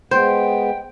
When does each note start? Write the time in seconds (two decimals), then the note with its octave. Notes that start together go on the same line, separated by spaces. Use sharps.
0.11 G#3 B3 C5 G5